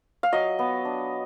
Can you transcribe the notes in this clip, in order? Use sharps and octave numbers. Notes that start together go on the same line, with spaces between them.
F5
F#3 D#5
B3
D4